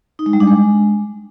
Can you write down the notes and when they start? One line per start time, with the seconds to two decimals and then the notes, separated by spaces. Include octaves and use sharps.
0.19 D#4
0.26 G#3
0.33 G3
0.40 D4
0.48 G#3